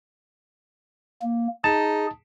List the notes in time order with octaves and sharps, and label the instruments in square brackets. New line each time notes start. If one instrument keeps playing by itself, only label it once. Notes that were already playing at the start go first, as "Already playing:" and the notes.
[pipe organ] A#3
[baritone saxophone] D#4 [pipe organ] G#4 [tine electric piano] A5